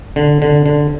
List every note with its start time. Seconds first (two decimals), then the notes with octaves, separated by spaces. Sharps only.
0.16 D3
0.42 D3
0.66 D3